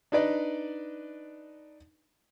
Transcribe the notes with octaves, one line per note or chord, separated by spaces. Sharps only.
D4 D#4 B4 D5 D#5